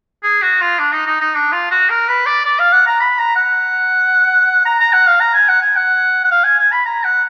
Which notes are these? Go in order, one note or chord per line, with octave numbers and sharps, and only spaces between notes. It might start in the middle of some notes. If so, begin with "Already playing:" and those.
G#4
F#4
F4
D4
D#4
D#4
D#4
D4
F4
F#4
A#4
B4
D5
D5
F5
F#5
A#5
B5
A#5
F#5
A#5
A#5
F#5
F5
A#5
G#5
F#5
G#5
F#5
F#5
F5
G#5
G#5
B5
A#5
F#5